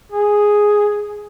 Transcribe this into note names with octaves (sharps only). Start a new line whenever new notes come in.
G#4